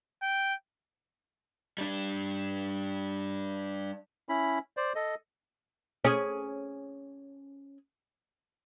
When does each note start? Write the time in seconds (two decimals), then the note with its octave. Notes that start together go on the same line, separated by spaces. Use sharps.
0.22 G5
1.78 G3 D4
4.29 C#4 E4 B5
4.77 C5 D5
4.96 A4 D#5
6.05 C#4 G#4